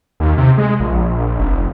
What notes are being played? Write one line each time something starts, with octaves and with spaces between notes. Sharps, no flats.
D#2
C3
G#3
A#1
F1